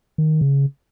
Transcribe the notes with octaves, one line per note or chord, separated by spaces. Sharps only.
D#3
C#3